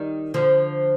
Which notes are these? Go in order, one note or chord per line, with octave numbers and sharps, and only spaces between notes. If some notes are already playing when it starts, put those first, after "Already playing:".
Already playing: D#3 G3
D3 F3